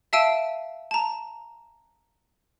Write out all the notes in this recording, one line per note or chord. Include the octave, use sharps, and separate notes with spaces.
E5 F5 A5 E6 D7 D#7
A5 A#5